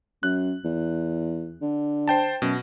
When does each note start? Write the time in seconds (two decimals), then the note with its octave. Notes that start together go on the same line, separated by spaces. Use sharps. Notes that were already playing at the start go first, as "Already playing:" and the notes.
0.23 F#2 F#6
0.64 E2
1.62 D3
2.08 C5 G5 A5
2.42 F#2 B2